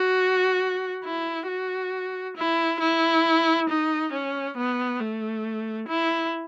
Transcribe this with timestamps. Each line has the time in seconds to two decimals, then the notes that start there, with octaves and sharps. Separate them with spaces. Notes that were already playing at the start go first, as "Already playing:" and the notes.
Already playing: F#4
1.04 E4
1.48 F#4
2.37 E4
2.80 E4
3.69 D#4
4.13 C#4
4.57 B3
5.00 A3
5.88 E4